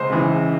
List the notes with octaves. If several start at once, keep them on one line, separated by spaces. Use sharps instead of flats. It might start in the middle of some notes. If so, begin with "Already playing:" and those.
Already playing: C#2 C5
C#3 E3